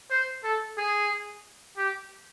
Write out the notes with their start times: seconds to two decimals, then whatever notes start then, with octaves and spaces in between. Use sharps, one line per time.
0.10 C5
0.44 A4
0.77 G#4
1.77 G4